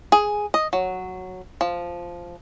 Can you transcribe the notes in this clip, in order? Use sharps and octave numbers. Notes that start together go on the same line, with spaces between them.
G#4
D#5
F#3
F3